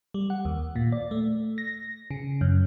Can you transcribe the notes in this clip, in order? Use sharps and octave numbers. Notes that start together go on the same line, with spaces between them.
G3
F#5
D#2
A#2
D5
A3
A#6
C#3
F#2